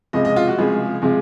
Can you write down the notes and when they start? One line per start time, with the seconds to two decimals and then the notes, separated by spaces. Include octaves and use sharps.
0.13 C#2 C3 F3 G#3 D#5
0.25 D#5
0.36 F4
0.47 F#4
0.58 C#2 C3 F3 G#3 G#4
1.02 C3 F3 G#3